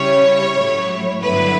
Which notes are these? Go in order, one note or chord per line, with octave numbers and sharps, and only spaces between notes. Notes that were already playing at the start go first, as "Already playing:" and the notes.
Already playing: C#3 G3 C#4 E4 C#5
A2 F#3 A3 E4
G2 D3 F#3 B3 E4 B4